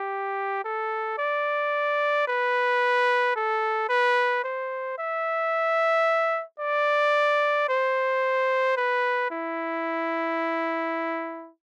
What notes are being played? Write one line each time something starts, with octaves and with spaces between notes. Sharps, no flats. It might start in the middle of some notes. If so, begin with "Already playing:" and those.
Already playing: G4
A4
D5
B4
A4
B4
C5
E5
D5
C5
B4
E4